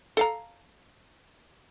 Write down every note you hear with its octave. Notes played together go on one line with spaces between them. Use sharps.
A4 F5 A#5